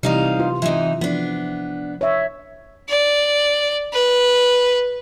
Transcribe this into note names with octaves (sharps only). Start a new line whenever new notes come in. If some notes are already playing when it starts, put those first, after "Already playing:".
C3 E3 G3 D#4 F5
F4
E3 C4 D#4
F3 B3 D4
C#5 E5
D5
B4